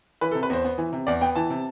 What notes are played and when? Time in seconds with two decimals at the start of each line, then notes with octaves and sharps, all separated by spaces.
0.21 E3 B4
0.31 A4
0.35 C3
0.43 B4
0.50 E2 C5
0.65 B3
0.78 E3
0.93 C3
1.07 E2 D5
1.21 B3 G5
1.35 E3 A5
1.50 C3